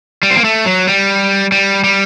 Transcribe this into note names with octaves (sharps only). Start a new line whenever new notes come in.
G3
C4
A#3
A3
F#3
G3
G3
G3